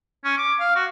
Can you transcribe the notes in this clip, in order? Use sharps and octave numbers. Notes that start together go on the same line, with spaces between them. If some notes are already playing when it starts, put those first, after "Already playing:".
C#4
D6
F5
F#4